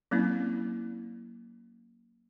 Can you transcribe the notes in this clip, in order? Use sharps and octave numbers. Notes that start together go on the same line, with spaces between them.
F#3 A#3 C4 C#4 E4